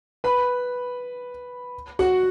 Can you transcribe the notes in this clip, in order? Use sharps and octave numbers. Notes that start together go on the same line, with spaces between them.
B4 B5
F#4 F#5